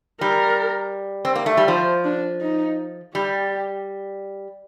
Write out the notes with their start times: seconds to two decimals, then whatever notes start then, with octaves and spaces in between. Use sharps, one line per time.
0.21 G3 A#4
1.25 C4
1.35 A#3
1.46 A3
1.57 G3
1.68 F3 C5
2.04 D4
2.41 D#4
3.15 G3 G4